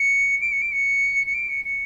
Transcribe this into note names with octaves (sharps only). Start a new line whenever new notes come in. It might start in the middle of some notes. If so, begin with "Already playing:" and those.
Already playing: C#7
D7
C#7
D7
C#7
C#7
D7
C#7
C#7